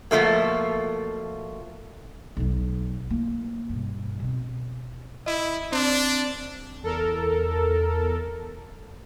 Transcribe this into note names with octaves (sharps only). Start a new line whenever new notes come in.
B2 F3 A3 A#3
B1 F#3
A#3 E4
G2 B2
B2 C4
E4 D#5
C4 D4
E2 A4 A#4